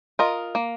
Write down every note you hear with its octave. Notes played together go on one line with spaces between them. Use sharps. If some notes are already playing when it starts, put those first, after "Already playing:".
F4 A#4 D#5
A#3